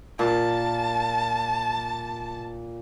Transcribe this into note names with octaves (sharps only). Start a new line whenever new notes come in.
A#2 A5